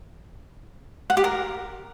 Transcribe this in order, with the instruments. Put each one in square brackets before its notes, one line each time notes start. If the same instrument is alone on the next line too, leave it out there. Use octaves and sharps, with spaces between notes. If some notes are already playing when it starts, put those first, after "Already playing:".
[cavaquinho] F#5
G4
A#4